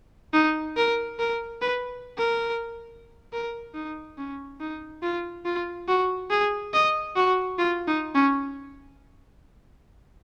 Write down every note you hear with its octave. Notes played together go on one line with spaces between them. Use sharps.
D#4
A#4
A#4
B4
A#4
A#4
D#4
C#4
D#4
F4
F4
F#4
G#4
D#5
F#4
F4
D#4
C#4